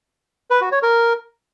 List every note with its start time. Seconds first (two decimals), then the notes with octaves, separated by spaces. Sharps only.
0.50 B4
0.61 F#4
0.72 C#5
0.82 A#4